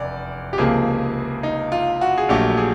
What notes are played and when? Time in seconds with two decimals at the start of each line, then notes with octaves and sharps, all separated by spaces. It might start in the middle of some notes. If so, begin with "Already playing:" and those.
Already playing: F1 E2 D5
0.53 G4
0.58 C#2 C3 F3 A#3 G#4
1.43 D#4
1.72 F4
2.01 F#4
2.18 G#4
2.29 A#1 A#2 F#3 A3 G4
2.57 G#4